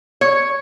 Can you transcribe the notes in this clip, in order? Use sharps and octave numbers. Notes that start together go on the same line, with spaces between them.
C#5